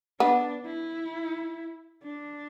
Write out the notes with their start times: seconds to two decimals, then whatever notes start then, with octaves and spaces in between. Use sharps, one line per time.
0.20 B3 D4
0.66 E4
2.03 D4